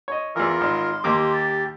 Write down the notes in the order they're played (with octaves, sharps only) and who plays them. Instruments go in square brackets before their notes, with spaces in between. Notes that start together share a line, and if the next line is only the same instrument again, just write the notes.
[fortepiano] C#5 D#5
[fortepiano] E2 E3 [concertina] F4 A#4
[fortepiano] G#1 [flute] C6
[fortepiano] D#2 A#3 D6 [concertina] G4
[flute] A6